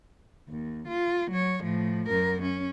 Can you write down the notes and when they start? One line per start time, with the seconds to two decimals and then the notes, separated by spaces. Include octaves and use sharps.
0.49 D#2
0.88 F4
1.31 F#3 C#5
1.63 A2 F3
2.09 F#2 A#4
2.42 C#4